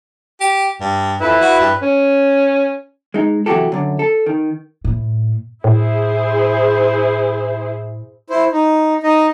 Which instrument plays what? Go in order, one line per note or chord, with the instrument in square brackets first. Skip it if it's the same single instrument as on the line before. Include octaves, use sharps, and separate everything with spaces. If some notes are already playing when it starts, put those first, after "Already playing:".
[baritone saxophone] G4
G2
[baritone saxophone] F2 [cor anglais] E4 [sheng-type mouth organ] B4
[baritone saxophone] F#4
G2
[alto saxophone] C#4
[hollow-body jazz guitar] G#3 D#4
C3 E3 F#3 F#4 G4 A4
F#2 D3
A4
D#3
[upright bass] A2
[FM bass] A2 [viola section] E4 G#4 C5
[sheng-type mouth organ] E4 C5
D#4
D#4 D#5